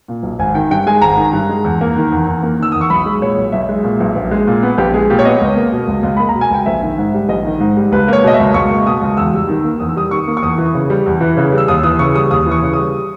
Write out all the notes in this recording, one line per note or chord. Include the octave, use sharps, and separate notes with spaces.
A#2
B1
G#1 G#5
D#3 G5
G2 G5
G#3 G#5
G#1 A#5
D#3
G2
G#3
E2
A#3
D#3
E2
E2
A#3
D#3 E6
E2 D#6
C#6
B1 B5
G#3
A#2 C#5
B1
B1 E5
G#3
A#2
B1
A#1
G#3
A#2
B3
A#1 G4
G#3 G#4
A#2 G4
C#5
B3 D#5
C#2
A#3
B2
C#2
C#2
A#3 B5
A#5
B2
G#5
C#2 G5
A#1 E5
D#3
G#2
G3
A#1 D#5
D#3
G#2
G3
C#2 B4
A#3 C#5
B2 D#5
E5
C#2
C#2 C#6
A#3
B2 D#6
C#2
E2 E6
G3
D#3
A#3
E2 D#6
E6
G3 D#6
D#3 C#6
A#3
C#6
E2 D#6
E3
C#3
G3
E2
E3
C#3
G3
E6
D#2 D#6
E3 D#6
C#3 C#6
G3 D#6
D#2 D#6
E3 C#6
C#3
D#6
G3